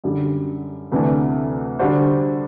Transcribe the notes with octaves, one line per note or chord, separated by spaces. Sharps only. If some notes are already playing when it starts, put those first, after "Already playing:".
F#2 D3 G3
D2 C3 E3 A3 D4
D3 G3 D4 F#4 C5